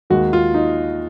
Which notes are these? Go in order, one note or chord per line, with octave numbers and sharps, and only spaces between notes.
D#2 D#3 G#3 F#4
F4
D#4